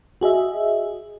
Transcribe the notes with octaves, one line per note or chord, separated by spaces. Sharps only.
F#4 G#4 D#5 E5